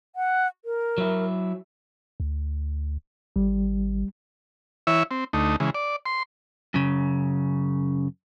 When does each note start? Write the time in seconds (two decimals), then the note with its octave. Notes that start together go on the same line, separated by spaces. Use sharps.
0.16 F#5
0.65 A#4
0.98 F#3 E4
2.20 D2
3.36 G#1 G3
4.87 E3 E4 C#5 E5
5.11 C4
5.33 D2 A3 D#4
5.60 C#3 E3 G#3
5.75 D5
6.06 C6
6.74 F#2 C#3